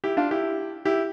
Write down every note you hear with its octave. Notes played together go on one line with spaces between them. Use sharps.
E4 G4
D4 F4
E4 G4
E4 G4